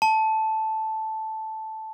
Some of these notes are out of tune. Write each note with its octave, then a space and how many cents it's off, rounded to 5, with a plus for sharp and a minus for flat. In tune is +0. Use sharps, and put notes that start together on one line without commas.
A5 -5